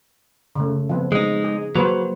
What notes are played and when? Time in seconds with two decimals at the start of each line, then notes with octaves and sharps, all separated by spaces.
0.55 C#3 A3
0.89 F3 B3 C4
1.12 G#3 D#4
1.44 G#4
1.76 F#3 A#3 B4 C5